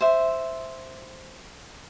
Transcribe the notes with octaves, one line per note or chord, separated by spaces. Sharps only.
C5 E5